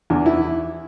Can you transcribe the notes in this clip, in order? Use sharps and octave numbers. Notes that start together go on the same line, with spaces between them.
E2 D4
E4